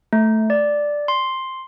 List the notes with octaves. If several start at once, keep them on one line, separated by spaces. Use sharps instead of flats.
A3
D5
C6